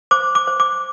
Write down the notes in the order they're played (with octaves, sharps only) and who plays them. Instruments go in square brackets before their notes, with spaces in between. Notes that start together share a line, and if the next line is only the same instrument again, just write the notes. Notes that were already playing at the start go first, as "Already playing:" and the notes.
[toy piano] C5 D6
D6
C5
D6